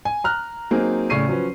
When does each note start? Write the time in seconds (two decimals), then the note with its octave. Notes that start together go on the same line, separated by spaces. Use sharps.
0.05 G#5
0.24 A#5 F6 F#6
0.71 F#3 A#3 C4 D#4 G#4
1.10 A2 C#3 D5 C#6 C7 D#7
1.28 F3 F#3 C#4 B4